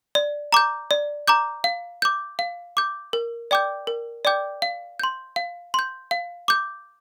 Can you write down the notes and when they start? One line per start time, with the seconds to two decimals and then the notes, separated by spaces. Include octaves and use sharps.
0.15 D5
0.52 A#5 D6 G6
0.91 D5
1.28 A#5 D6 G6
1.64 F5
2.02 D6 G6
2.39 F5
2.77 D6 G6
3.13 A#4
3.51 D5 G5 D6 G6
3.87 A#4
4.25 D5 G5 D6 G6
4.62 F5
5.00 C6 G6
5.36 F5
5.74 C6 G6
6.11 F5
6.48 D6 G6